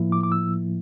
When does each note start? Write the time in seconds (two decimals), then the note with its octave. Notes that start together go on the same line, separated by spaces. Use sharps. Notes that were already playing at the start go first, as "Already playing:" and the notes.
Already playing: A2 F3 A#3 E4
0.12 D6
0.23 D6
0.32 E6